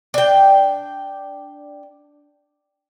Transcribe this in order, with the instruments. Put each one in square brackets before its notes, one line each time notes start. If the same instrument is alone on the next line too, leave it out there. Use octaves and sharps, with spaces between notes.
[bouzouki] D4 G5